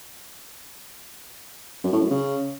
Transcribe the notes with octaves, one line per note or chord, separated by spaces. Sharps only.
F#2
A2
F#2
C#3